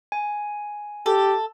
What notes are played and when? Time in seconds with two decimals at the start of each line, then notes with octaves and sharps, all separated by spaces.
0.12 G#5
1.06 G4 A4